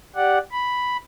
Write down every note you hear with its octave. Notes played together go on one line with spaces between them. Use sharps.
G4 D5 F#5
B5